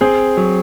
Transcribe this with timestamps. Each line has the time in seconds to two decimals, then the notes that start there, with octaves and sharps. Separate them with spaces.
0.01 C4 G#4
0.37 F#3